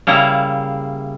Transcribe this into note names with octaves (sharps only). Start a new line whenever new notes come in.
C#3 G3 A#3 E4 A#5